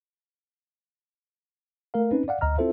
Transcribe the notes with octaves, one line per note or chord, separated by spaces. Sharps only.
A3 A#4 F5
C4 C#4 D#4 B4
D5 F5 F#5
D2 D#5 A#5 F6
C4 E4 F4 A4 C5 E5